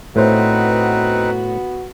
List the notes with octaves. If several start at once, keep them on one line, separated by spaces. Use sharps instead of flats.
A2 B3 C4 D#4 F#4 B4 C5